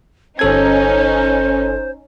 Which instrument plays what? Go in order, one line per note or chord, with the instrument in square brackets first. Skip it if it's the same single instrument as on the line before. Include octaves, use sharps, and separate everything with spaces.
[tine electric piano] G1 A4 G#6 [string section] C#4 D#4 [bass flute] C5